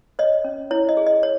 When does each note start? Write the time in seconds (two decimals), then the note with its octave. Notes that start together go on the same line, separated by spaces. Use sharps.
0.19 C#5 D#5
0.44 C#4
0.71 E4 C#5
0.89 D#5
0.97 G#4
1.06 D#5
1.23 C#5